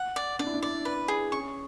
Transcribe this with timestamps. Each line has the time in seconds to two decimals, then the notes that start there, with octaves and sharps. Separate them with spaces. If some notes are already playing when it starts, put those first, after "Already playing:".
Already playing: F#5
0.16 D5
0.39 D4 D5
0.46 E4
0.54 D4
0.62 E4 D5
0.85 B4
1.08 G#4
1.31 C#4 C#6